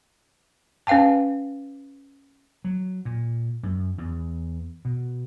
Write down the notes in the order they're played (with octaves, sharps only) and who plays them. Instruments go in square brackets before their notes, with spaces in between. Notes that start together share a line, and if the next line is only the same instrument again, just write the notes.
[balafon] C#4 B4 F5 G5 A5
[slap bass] F#3
A#2
F#2
E2
B2